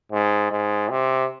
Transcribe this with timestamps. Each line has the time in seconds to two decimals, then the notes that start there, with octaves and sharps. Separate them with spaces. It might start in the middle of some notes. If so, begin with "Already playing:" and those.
0.12 G#2
0.51 G#2
0.90 C3